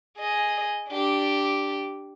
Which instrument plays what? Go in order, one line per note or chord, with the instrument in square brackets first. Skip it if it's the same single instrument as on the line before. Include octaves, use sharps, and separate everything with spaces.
[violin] G#4 D#5
D4 G4